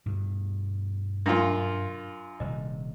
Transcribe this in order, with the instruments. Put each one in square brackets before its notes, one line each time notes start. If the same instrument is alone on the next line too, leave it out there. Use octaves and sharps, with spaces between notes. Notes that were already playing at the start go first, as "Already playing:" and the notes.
[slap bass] G2 B2 D3
[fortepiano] F#2 F4 [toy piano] D4 F5 C6
[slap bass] D#1 C3 G3 [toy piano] D#5